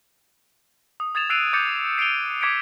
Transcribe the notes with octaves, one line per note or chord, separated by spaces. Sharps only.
D#6
D#6 G#6 A6 E7 F7
E6 F#6 C7 D7 D#7 F7
D6 G6 A6 C#7
C7 D7 D#7 F7 G7
D6 G#6 B6 C#7 D7